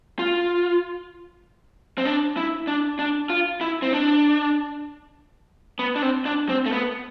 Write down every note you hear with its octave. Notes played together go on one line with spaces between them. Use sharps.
F4
C4
D4
E4
D4
D4
F4
E4
C4
D4
B3
D4
C4
D4
C4
A3
B3